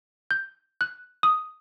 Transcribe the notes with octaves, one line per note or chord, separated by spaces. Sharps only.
G6
F#6
D#6